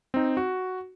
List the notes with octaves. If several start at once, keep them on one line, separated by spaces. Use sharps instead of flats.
C4 D#4
F#4